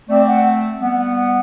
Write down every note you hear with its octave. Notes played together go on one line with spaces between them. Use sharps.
A3 C4 D5
F#5
G3 B3 F#5
F#5
F#5